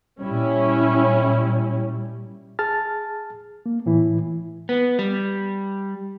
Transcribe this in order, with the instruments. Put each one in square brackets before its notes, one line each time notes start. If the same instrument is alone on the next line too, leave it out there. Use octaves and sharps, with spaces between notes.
[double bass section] A#2 G3 [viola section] C#4 E4
[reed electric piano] G#4 A5 F6 A6
A#3
A2 E3 E4
[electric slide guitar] B3
G3